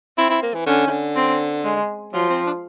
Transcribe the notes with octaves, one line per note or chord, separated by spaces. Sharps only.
C4 E4
E4
A#3
E3
D3 C#4
D#3
D3
C4
G#3
F3 F#3
C4
D4